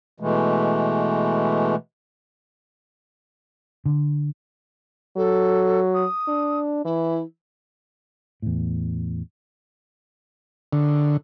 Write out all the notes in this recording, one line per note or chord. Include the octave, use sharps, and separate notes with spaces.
B2 E3 G#3 A3
D3
F#3 A4
D#6
D4
E3 E4
E2 A2
D3